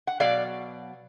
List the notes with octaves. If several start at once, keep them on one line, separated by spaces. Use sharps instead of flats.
F#5
B2 F#3 D5 F5